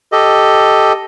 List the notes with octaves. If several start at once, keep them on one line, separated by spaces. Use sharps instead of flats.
G4 A4 D#5